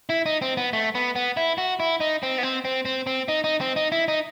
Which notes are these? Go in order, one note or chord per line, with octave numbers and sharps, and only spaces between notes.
E4
D#4
C4
B3
A3
B3
B3
E4
F#4
E4
D#4
C4
B3
C4
C4
C4
C4
D#4
D#4
C4
D#4
E4
D#4